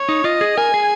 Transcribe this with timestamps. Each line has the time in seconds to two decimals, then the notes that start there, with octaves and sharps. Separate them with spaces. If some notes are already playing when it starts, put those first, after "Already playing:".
Already playing: C#5
0.09 D#4
0.24 F4 D#5
0.41 G#4
0.58 A#4 G#5
0.74 G#4